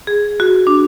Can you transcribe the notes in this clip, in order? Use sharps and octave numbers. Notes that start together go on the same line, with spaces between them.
G#4
F#4
D4